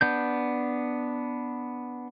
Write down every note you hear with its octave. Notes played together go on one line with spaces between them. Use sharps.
B3 D4 G6